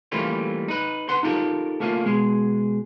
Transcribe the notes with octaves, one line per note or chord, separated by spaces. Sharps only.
E3 G3 A3 A#3 C#4 F4
D#4 B4
B4 F#5 C6
D#4 F4 G4 A4 A#4
A3 A#3 C#4 F4
B2 G#3 G#4